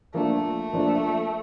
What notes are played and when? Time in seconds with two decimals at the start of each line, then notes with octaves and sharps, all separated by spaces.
0.14 F3 A3 A#3 D4
0.73 F3 A#3 D4